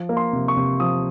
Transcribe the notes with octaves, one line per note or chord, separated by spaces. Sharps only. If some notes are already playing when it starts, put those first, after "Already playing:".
Already playing: F3
A#3
C6
C3
C#6
C3
F3 D#6